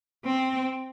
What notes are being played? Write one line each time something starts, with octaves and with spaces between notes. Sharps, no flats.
C4